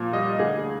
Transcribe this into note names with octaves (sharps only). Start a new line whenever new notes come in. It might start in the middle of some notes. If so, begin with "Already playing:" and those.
Already playing: A#2 F3
G3 D#5
D2 G#4